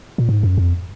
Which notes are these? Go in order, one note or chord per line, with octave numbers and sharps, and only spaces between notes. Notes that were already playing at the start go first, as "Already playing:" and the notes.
A#2
G#2
F#2
F2